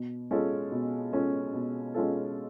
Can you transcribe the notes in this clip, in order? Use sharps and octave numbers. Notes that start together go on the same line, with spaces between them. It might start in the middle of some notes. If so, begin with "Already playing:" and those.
Already playing: B2
G#3 C#4 F4 A4
B2
G#3 C#4 F4 A4
B2
G#3 C#4 F4 A4